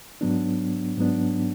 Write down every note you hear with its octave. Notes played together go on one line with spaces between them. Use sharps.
G#2 F#3 B3 D4
G#2 F#3 B3 D4